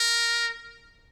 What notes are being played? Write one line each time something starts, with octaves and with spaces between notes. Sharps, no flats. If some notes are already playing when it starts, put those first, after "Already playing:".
Already playing: A#4